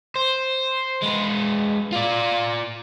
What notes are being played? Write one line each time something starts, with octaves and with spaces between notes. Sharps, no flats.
C5
G#3 B3
F4 D5